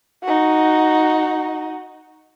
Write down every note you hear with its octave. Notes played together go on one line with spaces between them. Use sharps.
D#4 F#4